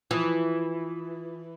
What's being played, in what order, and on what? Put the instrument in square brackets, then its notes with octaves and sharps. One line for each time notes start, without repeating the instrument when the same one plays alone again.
[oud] E3 [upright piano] F3 D#6